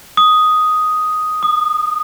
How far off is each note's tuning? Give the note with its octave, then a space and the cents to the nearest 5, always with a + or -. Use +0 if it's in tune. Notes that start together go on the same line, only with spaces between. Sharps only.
D#6 +5
D#6 -30